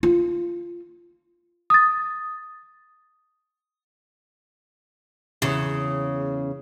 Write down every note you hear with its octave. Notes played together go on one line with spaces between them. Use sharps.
F4
D#6 A6
E2 C#3